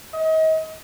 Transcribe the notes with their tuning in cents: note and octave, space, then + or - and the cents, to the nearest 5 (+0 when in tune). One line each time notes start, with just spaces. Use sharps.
D#5 +35